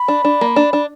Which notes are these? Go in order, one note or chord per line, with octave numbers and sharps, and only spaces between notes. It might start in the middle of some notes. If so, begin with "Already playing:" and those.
Already playing: B5
D4
D4
A#3
D4
D4